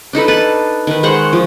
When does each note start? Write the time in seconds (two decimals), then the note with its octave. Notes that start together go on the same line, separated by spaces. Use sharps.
0.13 D4 D#4 A4 B4
0.28 B4 A5
0.87 D#3 B4
1.03 G#3 C5 F#5 C#6
1.33 F3